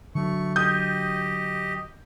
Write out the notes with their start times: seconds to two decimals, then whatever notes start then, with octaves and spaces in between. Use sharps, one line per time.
0.15 D3 F#3 A3 C#6
0.56 G4 D#5 D#6 G6